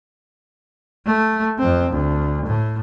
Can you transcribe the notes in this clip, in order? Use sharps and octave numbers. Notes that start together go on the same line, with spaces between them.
A3
F2 C4
D2
A2